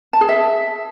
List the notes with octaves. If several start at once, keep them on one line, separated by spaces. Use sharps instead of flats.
A5
G#4
E5